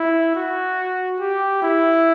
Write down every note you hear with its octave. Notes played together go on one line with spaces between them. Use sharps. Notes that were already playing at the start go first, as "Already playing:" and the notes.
Already playing: E4
F#4
G4
E4